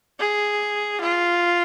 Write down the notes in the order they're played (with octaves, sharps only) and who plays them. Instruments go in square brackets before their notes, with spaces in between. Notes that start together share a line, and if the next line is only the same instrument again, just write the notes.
[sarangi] G#4
F4